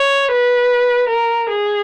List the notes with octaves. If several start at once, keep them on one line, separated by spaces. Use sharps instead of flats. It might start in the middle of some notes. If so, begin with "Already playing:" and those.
Already playing: C#5
B4
A#4
G#4